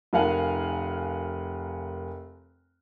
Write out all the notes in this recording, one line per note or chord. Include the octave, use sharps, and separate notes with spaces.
F1 A#4 F5 F#5 G#5